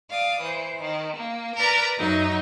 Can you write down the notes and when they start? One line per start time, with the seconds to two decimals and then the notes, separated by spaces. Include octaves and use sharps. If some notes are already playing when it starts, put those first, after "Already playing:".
0.10 D5 F5 D#6
0.41 E3 C5
0.82 D#3
1.17 A#3
1.56 A#4 B4 D5 A#5 E6
1.97 F#2 F#3 D#4 D#5 E5